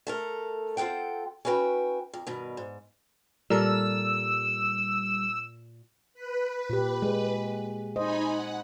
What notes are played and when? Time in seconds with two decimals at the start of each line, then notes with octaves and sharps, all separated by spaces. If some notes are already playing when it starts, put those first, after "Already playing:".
0.07 A3 A4 A#4
0.77 C4 F4 A4 F#5 G5
1.45 C#4 E4 F#4 B4 G5
2.13 F2
2.27 G2 B2 D#3
2.57 G#2
3.50 A#2 G3 A4 A#4 E6
6.14 B4
6.70 A#2 G4
7.02 G#3
7.96 D#4 C5 D#5 G#5 B5
8.28 F#5